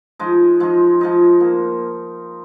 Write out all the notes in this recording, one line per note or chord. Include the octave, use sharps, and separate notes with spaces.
F3 G#3 D#4
F3 G#3 D#4
F3 G#3 D#4
A#3